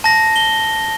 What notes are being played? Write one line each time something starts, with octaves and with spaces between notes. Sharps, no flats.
A5 A#6
G7